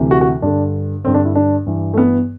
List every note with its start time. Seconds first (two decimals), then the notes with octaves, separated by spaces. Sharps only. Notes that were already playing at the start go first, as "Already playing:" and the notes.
Already playing: D2 C3 E3
0.11 F#4
0.21 F#4
0.42 G2 D3 D4
1.04 D3 C4
1.07 G2
1.14 D4
1.25 E4
1.35 D4
1.66 G2 E3
1.94 A3
1.98 B3